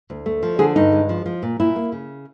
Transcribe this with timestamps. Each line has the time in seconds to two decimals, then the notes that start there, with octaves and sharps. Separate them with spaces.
0.10 D2
0.26 A3
0.43 F3
0.59 D3 G#4
0.76 G2 D#4
0.92 G#3
1.09 F3
1.26 F3
1.43 A#2
1.60 A#2 E4
1.76 A#3
1.92 C#3